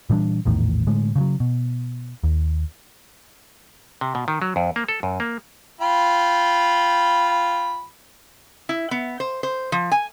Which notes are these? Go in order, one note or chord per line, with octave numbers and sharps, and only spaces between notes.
A#2 E3 G3 D4
A#1 E2 A2 D#3
A2 D3 G#3
C#3 F3 F#3
B2
D#2
C3
B2
D#3
F#3
F2
A#3
A4
F#2
A#3
F4 G5 B5
E4
B3
C5
C5
F3
G#5